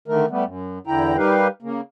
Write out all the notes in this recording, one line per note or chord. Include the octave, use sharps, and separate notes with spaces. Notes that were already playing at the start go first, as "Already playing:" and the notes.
D3 D#3 A3 A#4
G3 A3 B3
F#2
E2 D3 E4 G5 A#5
G3 D#4 G4 A#4 B4 F5
C#3 A#3